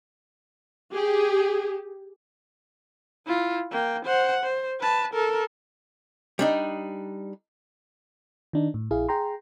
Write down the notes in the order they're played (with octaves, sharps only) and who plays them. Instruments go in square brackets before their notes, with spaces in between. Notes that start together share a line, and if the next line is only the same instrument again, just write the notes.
[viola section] G4 G#4
[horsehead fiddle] E4 F4
A#3 G5
C5 F#5
C5
B4 A5
A4 A#4
[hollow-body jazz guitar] G3 D4 D#4
[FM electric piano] D#3 D4 D#4
A2
A#1 E4 G#4 F5
G#4 G5 A#5 C6